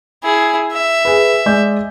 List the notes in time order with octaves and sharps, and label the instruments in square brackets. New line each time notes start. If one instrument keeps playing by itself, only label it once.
[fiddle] E4 G#4
E5
[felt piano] G#4 B4
G#3 D5 G6